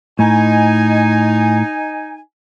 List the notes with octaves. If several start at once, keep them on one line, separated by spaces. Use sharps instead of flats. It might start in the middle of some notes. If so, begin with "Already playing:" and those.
A2 D#4 G#5